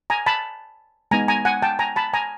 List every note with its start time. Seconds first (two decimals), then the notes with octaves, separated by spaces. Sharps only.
0.10 G#5 A#5
0.26 A5 B5
1.11 G#3 B3 D#4 G#5 A#5
1.28 G#5 A#5
1.45 F#5 G#5
1.62 G5 A5
1.79 G#5 A#5
1.96 A5 B5
2.14 G#5 A#5